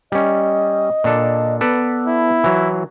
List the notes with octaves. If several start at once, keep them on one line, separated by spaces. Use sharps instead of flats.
G3 C#4 D#5
A#2 D4 A4
B3 A4 B4 D5
E4
E3 F#3